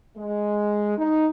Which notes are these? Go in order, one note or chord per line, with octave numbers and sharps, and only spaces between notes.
G#3
D#4